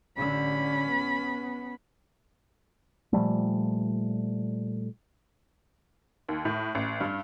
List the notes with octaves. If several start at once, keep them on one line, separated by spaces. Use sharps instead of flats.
A1 D3 C#4 B5
B3
A#2 F3 G3 A3
D#2
A2
A1
G2